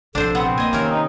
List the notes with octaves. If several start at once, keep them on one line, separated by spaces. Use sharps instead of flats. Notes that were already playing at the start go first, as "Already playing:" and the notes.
A#1 C3 D4 A4 C5
B3 C4 F#5
A#3 D#5 G#5
C3 D#3 C#4 A#4
D#4